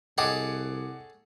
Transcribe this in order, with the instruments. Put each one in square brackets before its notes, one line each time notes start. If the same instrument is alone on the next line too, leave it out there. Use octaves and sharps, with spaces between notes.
[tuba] C2 [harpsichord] G#4 A4 C#5 [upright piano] D#5 F#5 D6